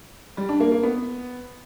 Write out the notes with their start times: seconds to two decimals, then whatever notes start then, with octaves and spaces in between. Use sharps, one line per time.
0.37 G3
0.49 D4
0.60 A#3
0.72 A#3
0.83 B3